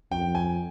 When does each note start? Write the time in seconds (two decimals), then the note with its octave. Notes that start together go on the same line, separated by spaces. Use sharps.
0.11 F2 G5
0.35 G#5